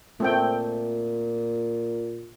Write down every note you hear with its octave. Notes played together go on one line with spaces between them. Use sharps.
A#2 A3 C4 G5